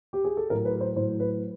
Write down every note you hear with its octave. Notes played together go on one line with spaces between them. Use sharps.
G4
G#4
A4
A2 F#3 A#4
B4
C5
A2 F#3 C5
B4